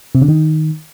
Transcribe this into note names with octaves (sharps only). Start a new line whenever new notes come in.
C3
D3
D#3